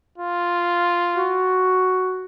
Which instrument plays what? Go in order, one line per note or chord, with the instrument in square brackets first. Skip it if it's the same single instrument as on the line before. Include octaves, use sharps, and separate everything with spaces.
[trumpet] F4
[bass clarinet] F#4